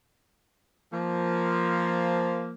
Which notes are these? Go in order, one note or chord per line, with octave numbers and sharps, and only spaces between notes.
F3 A#3